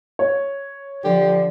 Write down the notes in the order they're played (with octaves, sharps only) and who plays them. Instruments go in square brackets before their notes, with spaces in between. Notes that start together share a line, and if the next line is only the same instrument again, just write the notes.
[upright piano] C#5
[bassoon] D3 [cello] F3 [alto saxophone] G4